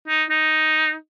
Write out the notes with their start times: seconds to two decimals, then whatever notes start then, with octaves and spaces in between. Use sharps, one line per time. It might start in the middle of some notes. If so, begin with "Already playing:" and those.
0.08 D#4
0.30 D#4